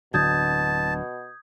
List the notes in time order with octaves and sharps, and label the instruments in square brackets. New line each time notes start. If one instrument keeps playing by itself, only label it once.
[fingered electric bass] D1 D3 F#3 [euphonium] B2 [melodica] A5 [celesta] D#6 G6 G#6